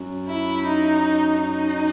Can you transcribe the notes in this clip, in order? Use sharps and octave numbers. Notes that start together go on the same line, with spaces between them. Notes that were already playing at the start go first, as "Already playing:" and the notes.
Already playing: F#2
E4
D#4
D#4